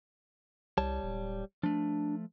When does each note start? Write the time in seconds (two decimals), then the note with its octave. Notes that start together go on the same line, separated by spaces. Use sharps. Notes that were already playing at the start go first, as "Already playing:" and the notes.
0.78 C2 G3 C#5 A5
1.03 D1
1.63 F3 A3 D4